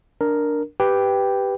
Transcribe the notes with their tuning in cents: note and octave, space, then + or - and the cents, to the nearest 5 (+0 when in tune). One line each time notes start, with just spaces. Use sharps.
D4 +0 A#4 +0
G4 +0 B4 +0 G5 +0